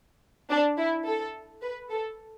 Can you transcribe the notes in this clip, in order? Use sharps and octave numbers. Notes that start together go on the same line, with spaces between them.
D4
E4
A4
B4
A4